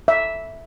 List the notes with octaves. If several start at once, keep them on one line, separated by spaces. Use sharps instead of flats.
E5